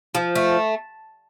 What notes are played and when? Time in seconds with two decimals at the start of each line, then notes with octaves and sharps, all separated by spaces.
0.15 F3
0.35 A3